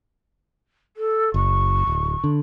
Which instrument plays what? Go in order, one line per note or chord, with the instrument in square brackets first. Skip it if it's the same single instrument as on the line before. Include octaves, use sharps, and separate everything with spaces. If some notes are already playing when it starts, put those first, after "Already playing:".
[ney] A4
[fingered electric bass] F#1 [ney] C#6
[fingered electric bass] D1
D3